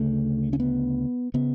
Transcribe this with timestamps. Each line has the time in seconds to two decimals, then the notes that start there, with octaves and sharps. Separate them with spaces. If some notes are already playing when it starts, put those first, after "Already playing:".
Already playing: D2 C#3 A3
0.53 C#4
0.60 B3
1.34 C#3 B3